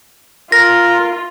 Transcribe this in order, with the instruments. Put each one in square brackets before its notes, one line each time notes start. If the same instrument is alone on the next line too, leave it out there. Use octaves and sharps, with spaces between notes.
[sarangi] F4 [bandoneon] A#4 [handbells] A#6